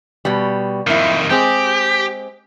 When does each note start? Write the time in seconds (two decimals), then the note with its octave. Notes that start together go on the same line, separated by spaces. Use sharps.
0.25 B2 G3
0.87 F2 D#3 A#3 E4
1.30 G#3 C4 G4 G#4